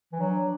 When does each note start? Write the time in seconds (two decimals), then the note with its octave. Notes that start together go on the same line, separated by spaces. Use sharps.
0.13 E3
0.20 F#3 D4